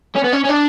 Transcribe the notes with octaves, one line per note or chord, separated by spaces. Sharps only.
C#4
B3
C#4
C#4
D4